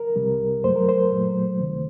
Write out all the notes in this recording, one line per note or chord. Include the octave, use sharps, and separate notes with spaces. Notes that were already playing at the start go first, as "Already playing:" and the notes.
Already playing: A#4
C2 C3 G3
F#2 F#3 A3 C5
A#4
C5
A#2 F#3 A3
D2 C3 D#3 A3